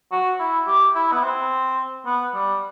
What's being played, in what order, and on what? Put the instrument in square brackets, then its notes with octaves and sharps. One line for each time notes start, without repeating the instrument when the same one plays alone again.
[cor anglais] F#4
E4
G4
E4
B3
C4
B3
G3